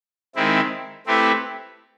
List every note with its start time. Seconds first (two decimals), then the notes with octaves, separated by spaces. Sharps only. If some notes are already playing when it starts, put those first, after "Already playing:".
0.35 D#3 G#3 C4 E4
1.07 A3 C4 E4 G4 B4